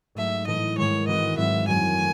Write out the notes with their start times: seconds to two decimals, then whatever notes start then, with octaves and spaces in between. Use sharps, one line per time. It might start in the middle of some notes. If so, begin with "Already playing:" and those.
0.15 G#2 F#3 A3 D#4 E5
0.47 A2 E3 A3 D#5
0.77 G#2 D#3 G#3 C#5
1.07 E3 C4 F#4 D#5
1.37 G#2 F#3 C4 E4 E5
1.67 F#2 D#3 F#3 C4 G#5
1.97 A3